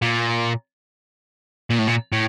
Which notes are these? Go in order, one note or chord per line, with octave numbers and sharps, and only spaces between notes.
A#2
A#2
A2
A#2
A2